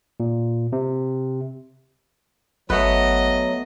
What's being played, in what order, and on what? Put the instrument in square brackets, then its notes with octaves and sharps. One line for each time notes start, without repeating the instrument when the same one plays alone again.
[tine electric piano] A#2
C3
[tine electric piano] G#1 [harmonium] F#3 [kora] A3 B3 B4 [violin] D#5